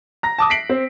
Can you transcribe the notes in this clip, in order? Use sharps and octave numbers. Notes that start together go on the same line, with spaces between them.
A#5 A#6
A5 D6 D#6
B6 C7 D7 F#7
C4